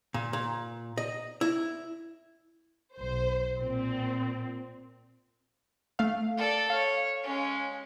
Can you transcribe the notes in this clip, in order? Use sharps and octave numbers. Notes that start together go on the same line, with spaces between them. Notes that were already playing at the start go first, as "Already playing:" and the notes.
A#2
A#2
D#5
E4
B1 C5
A#2 C4
A3 F5
A4 D5
C#5 F5
G#3 C#4